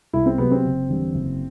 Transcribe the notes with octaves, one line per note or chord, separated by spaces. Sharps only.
C2 E4
C4
C3 F#3 B3
C4
F#1
E2 D3 G3
F#1